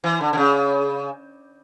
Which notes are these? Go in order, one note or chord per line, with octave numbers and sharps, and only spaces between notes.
E3
D3
D3
C#3